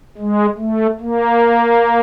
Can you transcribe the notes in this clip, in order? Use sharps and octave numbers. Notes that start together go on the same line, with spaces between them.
G#3
A3
A#3